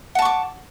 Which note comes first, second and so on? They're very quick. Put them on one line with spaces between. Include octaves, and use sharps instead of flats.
F#5 A5 C#6 D6